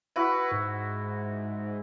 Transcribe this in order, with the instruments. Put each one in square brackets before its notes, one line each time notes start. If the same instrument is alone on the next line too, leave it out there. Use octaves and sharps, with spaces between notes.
[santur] E4 F#4 [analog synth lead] B4
[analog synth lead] G#2